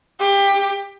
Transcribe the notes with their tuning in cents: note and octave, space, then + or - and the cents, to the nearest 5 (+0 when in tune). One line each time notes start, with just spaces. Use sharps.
G4 +20